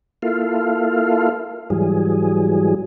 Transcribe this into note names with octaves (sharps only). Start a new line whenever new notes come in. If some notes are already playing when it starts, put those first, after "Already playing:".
A#3 E4 F4 A4 F5
G#2 E3 F#3 G3 G#4